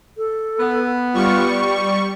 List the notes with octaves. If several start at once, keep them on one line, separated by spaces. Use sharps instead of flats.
A4
B3
G3 F4 C#6
D5